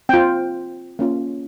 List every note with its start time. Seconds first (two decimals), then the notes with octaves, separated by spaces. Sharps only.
0.09 C4 F4 G5
0.99 A#3 C#4 F4